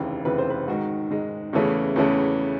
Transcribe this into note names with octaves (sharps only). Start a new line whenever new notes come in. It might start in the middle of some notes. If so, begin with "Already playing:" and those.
Already playing: F1 D#2 C#3 E3
F1 D#2 C#3 E3 B4
C5
B4
G#2 D#3 G#3 F#4
G#2 D#3 G#3
E2 C#3 E3 A3 C#4
E2 C#3 E3 A3 C#4